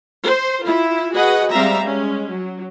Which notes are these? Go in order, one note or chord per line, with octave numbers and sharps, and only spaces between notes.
C5
E4 F4
F#4 G#4 B4 D#5 F#5
G3 G#3 C4 E5 F5 A#5
G#3 C#4
F#3